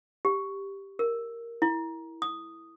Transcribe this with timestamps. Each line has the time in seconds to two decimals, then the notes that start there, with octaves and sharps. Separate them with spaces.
0.25 G4
0.99 A#4
1.62 E4
2.22 D#6